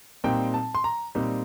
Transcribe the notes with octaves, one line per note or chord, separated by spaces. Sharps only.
A#2 G3 C4 D#4 G5
A5
C6
A#5
A#2 G3 C4 D#4